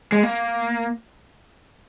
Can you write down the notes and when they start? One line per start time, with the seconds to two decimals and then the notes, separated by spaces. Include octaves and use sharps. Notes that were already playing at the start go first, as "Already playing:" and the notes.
0.12 G#3
0.23 A#3